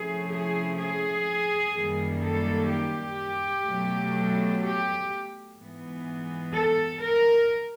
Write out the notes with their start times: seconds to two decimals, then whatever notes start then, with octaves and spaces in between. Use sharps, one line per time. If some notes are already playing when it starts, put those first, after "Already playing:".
Already playing: C3 F3 A3 C#4 E4 G#4
0.30 G#4
0.78 G#4
1.74 F#2 D#3 G3 A#3
2.22 A4
2.69 G4
3.66 B2 F#3 A3
4.61 G4
5.57 G#2 E3 G#3 B3
6.53 A4
7.01 A#4